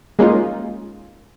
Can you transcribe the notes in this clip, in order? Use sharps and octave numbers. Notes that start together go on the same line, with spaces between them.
G#3 A#3 C#4 D#4 F4